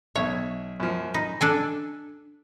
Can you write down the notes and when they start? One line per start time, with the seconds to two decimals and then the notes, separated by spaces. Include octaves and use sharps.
0.16 B1 C#5 E5
0.80 F#2 F3
1.14 D#4 B5
1.41 D4 A4 G#5